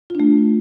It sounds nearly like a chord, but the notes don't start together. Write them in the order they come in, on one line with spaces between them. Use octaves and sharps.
F4 D4 A3